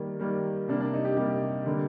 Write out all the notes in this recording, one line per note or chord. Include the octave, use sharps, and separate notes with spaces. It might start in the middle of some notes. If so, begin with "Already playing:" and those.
Already playing: D#3 G3 A#3
D#3 G3 A#3
C3 G3 A#3 D4
D4
D#4
G4
C3 G3 A#3 G4
D3 G3 A#3